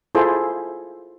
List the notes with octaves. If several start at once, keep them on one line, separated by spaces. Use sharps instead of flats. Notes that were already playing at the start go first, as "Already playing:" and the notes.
E4 F4 G#4 A4 C5